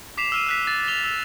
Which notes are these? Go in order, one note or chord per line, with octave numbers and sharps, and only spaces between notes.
D6 B6 C7 E7 F7
E6 F6 D#7
E6 F#6 B6
A6
D6 A6 F7 G7
E6